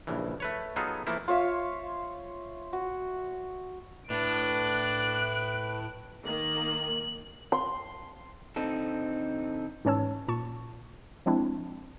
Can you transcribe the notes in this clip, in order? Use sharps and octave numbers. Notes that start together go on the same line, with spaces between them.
A#1 G2 C#3 E3
A3 B4 C#5
F#3 B3 D#4 F4 G#4 A4
E3 F3 A3 A#3 E4
F4 C#5 E5 F5
F#4
A2 D4 B4 F#6 D7
D#3 A#3 F#7
C6
D3 C4 D#4 A4
G#2 E3 C#4 C#5 A5 E6
A#2 A5 C#6
F3 G#3 C4 D4 E4